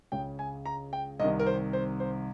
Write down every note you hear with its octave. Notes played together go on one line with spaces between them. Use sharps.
C#2 C#3 G5
G#5
A#5
G5
C2 C3 D#3 D#5
A#4
C5
C5
C5